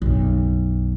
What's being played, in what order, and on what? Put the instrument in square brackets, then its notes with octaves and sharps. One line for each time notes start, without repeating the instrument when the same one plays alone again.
[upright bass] B1 F#2